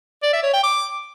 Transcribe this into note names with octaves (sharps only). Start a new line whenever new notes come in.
D5
E5
C#5
G5
D6